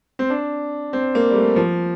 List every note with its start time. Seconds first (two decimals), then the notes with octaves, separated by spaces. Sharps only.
0.19 C4
0.30 D4
0.93 C4
1.15 A#3
1.30 G3
1.35 A3
1.56 F3